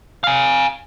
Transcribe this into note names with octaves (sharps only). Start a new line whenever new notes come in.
F5 G#5